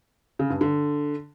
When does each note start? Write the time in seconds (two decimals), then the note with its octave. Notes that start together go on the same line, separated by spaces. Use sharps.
0.39 C#3
0.50 G2
0.61 D3